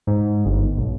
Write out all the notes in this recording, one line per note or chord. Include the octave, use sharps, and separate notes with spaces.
G#2
G1
B1